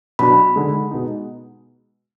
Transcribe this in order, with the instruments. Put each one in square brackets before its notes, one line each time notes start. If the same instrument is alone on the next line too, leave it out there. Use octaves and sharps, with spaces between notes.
[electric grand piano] B2 F#3 D4 F#4 [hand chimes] B5
[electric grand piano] D3 G#3 D#4
B2 G#3 B3 D#4